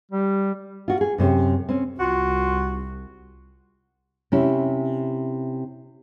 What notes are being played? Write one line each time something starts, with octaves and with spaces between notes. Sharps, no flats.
G3
F4 F#4
G#4
F#2 C3 C#4
C4 C#4
C2 F4 F#4
C3 C#4 E4